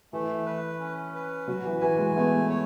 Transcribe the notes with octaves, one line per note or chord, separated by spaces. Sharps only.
E3 A3
B4
C#4
B4
F#3 F#4
E3
E3 G#5
G#3
A3 B3
C#5